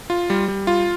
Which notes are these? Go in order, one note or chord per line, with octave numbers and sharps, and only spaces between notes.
F4
G3
G3
F4